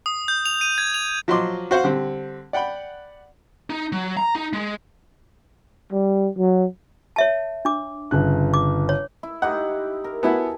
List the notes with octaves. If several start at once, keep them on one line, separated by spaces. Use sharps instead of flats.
D#6
G6
F7
D#7
G#6
F7
F3 F#3 D#5 C6 D6
F#4 C5 F5 F#5
D3 G3 C4
D5 F#5 G5 B5
D#4
F#3
A#5
D#4
G#3
G3
F#3
C#5 E5 A5
D4 D6
G1 C#3 F#6
D6
C#5
E4
D#4 E4 G4 F#5
A#4
B3 E4 F#4 E5 G#5 A5